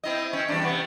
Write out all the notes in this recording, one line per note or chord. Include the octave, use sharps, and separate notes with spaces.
C4 E4 D#5
C4 C#4
E2 G2 D4
C3 B3